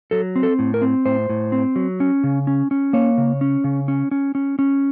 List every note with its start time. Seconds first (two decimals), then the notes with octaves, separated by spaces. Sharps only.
0.11 F#3 A4
0.36 C4
0.43 A4
0.59 A2
0.74 A#4
0.82 C4
1.06 A2 C5
1.29 A2
1.52 C4
1.76 F#3
2.00 C#4
2.24 C#3
2.47 C#4
2.71 C#4
2.93 A#3 C#5
3.18 C#3
3.41 C#4
3.64 C#3
3.88 C#4
4.11 C#4
4.35 C#4
4.59 C#4